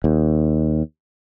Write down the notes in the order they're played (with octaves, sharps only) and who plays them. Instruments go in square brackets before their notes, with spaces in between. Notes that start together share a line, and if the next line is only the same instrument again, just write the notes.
[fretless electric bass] D#2